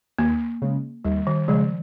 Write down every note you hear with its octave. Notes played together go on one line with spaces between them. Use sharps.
D#2 A#3
C#3 G#3
D#2 G3
D#3
C#3 F3 G#3